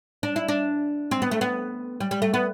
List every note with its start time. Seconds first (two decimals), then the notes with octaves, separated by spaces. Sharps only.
0.23 D4
0.36 E4
0.48 D4
1.11 C4
1.22 B3
1.31 A3
1.41 B3
2.00 G3
2.11 G3
2.22 A3
2.34 B3